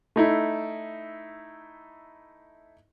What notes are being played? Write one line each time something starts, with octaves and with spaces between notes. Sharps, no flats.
A3 D#4 E4